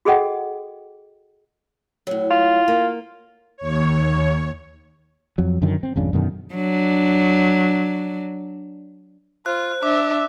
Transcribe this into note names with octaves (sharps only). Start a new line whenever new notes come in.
F#4 G#4 A4 D#5 F#5 G5
A2 F#3
F4
A#3
D#2 C#5
F2 F#3
F#2 D3 D#3 F#3
C4
G#1 F2 C#3 D4
F#2 B2 D3 D#3
F#3 D4
F4 C5 F#6
D4 E5 D6